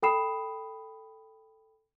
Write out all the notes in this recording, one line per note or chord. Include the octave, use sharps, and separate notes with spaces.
A4 G5 B5 D#6 C7 E7